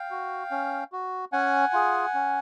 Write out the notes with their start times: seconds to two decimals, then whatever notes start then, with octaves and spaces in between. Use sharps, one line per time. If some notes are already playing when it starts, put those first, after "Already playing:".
Already playing: F5 G5
0.11 F#4
0.51 C#4
0.92 F#4
1.32 C#4 F#5 G#5
1.73 F4 G#4
2.14 C#4